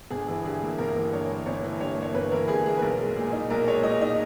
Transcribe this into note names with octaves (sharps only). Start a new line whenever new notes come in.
G1 G#4
E3
G2 G#4
A#3
G1 A#4
E3
G2 C#5
A#3
G1 C#5
E3
G2 C#5
A#3
C#5
G1 B4
E3 A#4
G2 G#4
A#3 G#4
B4
B1 A#4
G#3
A#2 G#4
D#4
B1 A#4
G#3 C#5
A#2 D#5
D#4 D#5